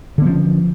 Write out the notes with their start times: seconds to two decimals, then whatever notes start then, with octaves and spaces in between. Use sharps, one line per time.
0.18 D3
0.22 B3
0.25 F3
0.29 C#4